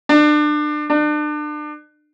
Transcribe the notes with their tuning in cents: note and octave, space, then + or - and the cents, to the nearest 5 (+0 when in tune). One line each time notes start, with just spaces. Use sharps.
D4 +30
D4 +35